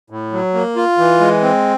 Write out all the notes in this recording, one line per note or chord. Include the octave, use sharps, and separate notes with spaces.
A2
F#3
A#3
F4
E3
G#3
C4